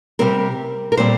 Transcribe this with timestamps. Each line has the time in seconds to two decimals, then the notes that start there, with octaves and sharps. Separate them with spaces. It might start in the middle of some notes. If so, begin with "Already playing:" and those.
0.19 C3 G3 C4 A#4
0.92 A#4
0.97 A#2 G3 C4 C5